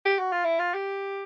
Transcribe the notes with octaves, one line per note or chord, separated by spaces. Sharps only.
G4
F#4
F4
E4
F4
G4